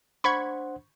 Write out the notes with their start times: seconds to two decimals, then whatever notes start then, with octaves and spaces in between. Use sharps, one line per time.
0.24 D4 C5 F#5 B5 C#6 G#6